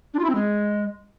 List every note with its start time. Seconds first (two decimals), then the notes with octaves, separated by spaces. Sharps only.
0.14 D4
0.19 F4
0.24 E4
0.30 C4
0.35 G#3